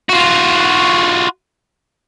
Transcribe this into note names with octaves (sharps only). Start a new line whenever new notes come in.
F4 F#4